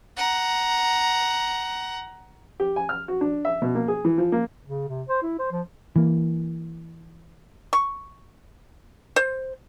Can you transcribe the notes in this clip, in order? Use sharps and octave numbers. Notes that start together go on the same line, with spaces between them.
F#5 A#5
G4
G#5
F6
F#4
D4
E5
B2
A#3
G#4
E3
F3
A#3
C#3
C3
C5
E4
C5
F3
E3 A#3
C#6
C5